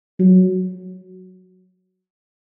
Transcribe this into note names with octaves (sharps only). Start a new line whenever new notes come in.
F#3